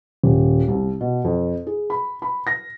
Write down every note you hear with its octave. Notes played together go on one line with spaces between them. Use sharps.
D#1
C2
B2
F2
G#4
B5
B5
A#6